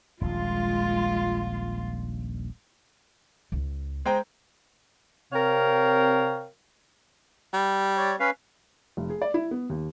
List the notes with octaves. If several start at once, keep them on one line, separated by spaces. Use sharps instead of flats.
D#1 A#1 G#3 F4
C#2
G#3 C5 G5 A#5
C3 C4 A#4 C#5 F5 G5
G3
C#5 D5
C#4 B4 F5
F1
G#4
D5
E4
B3
D#2